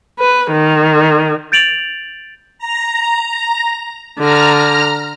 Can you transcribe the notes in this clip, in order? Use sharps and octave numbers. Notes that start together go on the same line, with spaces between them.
B4
D#3
G6 A6 D7 F7 F#7
A#5
D3 A#5 F6